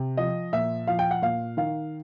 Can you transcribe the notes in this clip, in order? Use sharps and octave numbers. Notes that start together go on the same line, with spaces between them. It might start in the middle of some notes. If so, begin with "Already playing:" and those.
Already playing: C3
F3 D#5
A#2 E5
F3 F5
G5
F#5
A#2 F5
D#3 F5